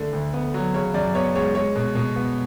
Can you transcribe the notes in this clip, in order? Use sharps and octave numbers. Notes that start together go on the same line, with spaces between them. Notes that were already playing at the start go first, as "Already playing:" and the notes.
Already playing: D3 A3
D2
B3
F#3
C#3 C#5
F#2 D5
B3 C#5
G#3 C#5
G#3 C#5
B2
B2
B3